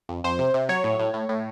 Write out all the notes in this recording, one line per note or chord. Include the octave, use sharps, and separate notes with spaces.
F2
F2 C5
C3
C3
F#3 C#5
A2
A2
A2
A2